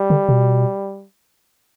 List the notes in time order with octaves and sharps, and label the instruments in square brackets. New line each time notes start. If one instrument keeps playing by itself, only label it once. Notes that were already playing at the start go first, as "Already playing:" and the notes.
Already playing: [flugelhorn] G3
[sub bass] D3
B2